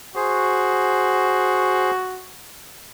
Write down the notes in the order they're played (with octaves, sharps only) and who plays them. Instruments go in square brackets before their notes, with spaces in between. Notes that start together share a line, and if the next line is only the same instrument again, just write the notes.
[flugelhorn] F#4 [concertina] G#4 C5